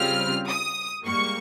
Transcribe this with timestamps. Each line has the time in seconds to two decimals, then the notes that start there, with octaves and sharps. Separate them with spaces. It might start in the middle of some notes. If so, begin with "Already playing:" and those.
Already playing: C#3 G3 C4 F4 F6
0.48 D#6
1.05 G#2 G3 A#3 C#6